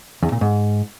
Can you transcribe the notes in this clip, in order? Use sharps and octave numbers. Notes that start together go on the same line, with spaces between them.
E2
A#2
G#2